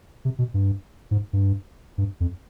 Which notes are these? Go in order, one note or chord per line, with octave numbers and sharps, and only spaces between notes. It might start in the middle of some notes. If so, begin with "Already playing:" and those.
C3
B2
G2
G#2
G2
G2
F2